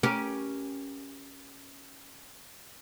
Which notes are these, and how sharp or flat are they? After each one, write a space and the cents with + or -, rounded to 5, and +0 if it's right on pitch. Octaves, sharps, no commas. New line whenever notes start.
C#4 +0 G4 +0 A#4 +25